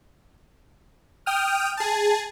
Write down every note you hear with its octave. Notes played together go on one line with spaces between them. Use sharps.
G5 D#6 F6
G#4 A5